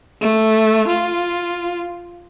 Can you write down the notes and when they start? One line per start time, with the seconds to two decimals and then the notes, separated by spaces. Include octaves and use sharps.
0.21 A3
0.88 F4